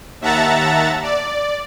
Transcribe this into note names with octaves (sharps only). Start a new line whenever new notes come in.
D#2 E5 F#5 A5 A#5 A6
D5